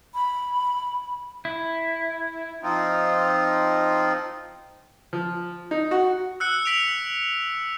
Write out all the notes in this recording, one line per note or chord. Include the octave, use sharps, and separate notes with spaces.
B5
E4
F3 C4 D#4 F4
F3
D#4
F#4
E6 F#6 C#7
B6 D7 F7